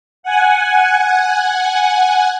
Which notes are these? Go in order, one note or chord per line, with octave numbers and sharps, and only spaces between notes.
F#5 G#5